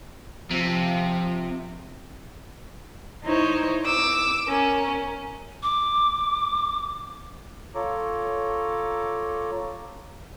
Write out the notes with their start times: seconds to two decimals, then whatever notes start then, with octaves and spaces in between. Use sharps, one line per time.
0.51 C3 F3
3.24 D#4 E4 C5 C#5
3.85 D6 E6
4.48 C#4 A#4
5.63 D6
7.75 F4 A4 C#5 A#5 D6